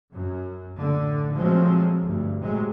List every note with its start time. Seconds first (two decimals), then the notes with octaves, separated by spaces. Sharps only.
0.12 F#2
0.75 A2 D3
1.34 A#2 F3 F#3 G#3 A3 C4
2.04 D2 G2
2.40 A2 C3 F#3 G#3